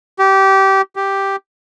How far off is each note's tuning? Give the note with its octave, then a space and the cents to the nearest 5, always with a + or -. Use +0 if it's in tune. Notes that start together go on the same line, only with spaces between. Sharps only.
G4 -20
G4 +0